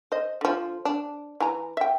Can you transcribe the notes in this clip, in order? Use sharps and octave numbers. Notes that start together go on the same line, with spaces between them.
C5 D#5
D3 F3
D4
E3 G#5 A#5
E5 G5